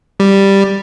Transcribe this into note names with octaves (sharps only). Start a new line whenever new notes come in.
G3